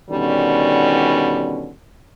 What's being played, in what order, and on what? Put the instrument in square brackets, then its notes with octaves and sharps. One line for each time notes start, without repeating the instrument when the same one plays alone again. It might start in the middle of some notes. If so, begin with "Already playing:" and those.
[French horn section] B2 D3 D#3 G3 C#4